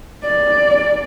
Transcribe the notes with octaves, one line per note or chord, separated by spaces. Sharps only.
D5